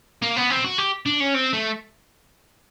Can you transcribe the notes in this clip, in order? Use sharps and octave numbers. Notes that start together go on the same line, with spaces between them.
A#3
B3
C4
F#4
G4
D4
C#4
C4
A3